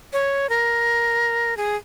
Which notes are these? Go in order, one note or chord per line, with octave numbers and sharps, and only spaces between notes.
C#5
A#4
G#4